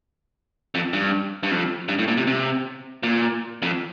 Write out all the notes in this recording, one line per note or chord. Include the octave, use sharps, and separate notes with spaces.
F2
G2
G2
F2
G2
A2
A#2
C3
C3
A#2
F2